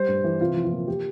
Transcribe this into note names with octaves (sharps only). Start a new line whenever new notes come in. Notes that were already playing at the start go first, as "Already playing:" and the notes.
Already playing: G3 C5
G2
E3
C3 F4
F3
F4
A#3
A#3 G4